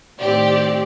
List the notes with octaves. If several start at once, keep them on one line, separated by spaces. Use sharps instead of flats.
A2 D#3 C4 G4 D5